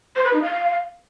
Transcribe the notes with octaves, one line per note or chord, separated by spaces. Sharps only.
C5
B4
D#4
F5